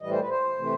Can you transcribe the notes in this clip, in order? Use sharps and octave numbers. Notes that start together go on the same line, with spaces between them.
A2 E3 G3 D#5
C5
B4
C5
C3 E3 A3